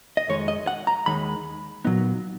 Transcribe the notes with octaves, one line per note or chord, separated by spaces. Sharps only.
D#5
F2 D#3 G#3 C#5
D#5
F#5
A#5
D#2 D#3 G#3 D#4 B5
A#2 F#3 B3 D#4